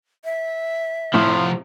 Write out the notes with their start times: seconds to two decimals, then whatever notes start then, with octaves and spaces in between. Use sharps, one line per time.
0.25 E5
1.14 A2 C3 F3 F4